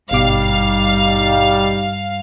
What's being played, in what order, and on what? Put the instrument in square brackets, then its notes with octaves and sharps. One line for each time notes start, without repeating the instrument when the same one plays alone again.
[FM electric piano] G#1 B2 D6 [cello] G2 [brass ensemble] G3 D#4 [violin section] F5